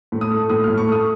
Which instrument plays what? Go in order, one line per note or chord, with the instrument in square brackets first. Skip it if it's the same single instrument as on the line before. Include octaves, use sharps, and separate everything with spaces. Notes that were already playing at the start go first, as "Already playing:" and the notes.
[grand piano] A2
D#6
A3
A2 D#6
A2 F6
C#6
A3 D#6